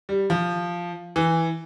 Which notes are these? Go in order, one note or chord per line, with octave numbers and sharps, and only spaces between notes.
G3
F3
E3